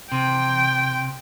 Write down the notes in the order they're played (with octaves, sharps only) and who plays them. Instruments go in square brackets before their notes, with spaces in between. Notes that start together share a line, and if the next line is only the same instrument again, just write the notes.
[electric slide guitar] C3 [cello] G5